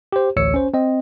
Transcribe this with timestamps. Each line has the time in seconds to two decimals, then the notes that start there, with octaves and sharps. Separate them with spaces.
0.12 G4 C5
0.37 A1 D2 C#5 E6 C#7
0.54 C#4 C5
0.74 C4 D#5